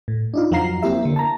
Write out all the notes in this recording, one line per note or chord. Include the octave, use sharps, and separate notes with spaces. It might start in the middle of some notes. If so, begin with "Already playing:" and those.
A2
D4 D#4 F4
F2 F3 F#3 F4 A#5 C7
A#3 C4 E4 G4 E5
D3 A#3
A5 A#5